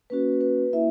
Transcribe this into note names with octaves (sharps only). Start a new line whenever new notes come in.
A#3 C#4 F#4 B4
B4
A#3 E4 E5